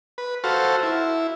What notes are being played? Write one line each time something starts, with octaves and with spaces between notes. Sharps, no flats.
B4
F#4 A4 C5 F5
E4